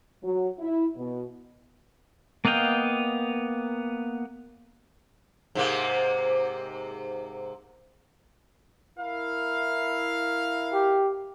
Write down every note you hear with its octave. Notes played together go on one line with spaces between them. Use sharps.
F#3
E4
B2
A#3 B3 D#5 F5 G5
G#2 C3 A#3
E4 A#4 F5
G4